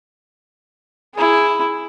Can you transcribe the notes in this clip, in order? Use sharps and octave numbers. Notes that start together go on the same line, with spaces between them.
E4 G#4